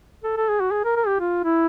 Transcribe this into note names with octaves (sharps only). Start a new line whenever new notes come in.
A4
A4
G#4
F#4
G#4
A#4
A#4
G4
F4
E4